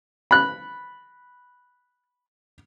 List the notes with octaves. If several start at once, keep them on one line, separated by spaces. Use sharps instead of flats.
B5 F#6